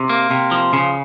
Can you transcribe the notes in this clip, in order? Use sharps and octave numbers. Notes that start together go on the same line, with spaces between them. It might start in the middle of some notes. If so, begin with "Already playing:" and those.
Already playing: C3
A#3
C3
F3
C#3